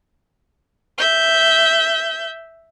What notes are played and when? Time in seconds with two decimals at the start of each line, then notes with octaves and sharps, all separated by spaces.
0.98 E5 G6